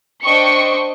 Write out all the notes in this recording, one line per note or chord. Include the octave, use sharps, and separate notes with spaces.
D4 C5 D#5 G5 C#6 C#7